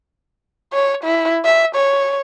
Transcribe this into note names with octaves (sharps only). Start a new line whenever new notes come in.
C#5
E4
E5
C#5